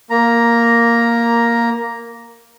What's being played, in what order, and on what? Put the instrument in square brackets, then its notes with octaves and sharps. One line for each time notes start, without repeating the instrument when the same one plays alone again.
[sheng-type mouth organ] A#3 A#5